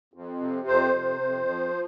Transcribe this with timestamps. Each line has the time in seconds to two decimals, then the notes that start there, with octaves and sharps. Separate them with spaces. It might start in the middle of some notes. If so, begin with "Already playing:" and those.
0.14 F2
0.40 C3
0.68 F2 C5
0.94 C3
1.21 F2
1.49 F3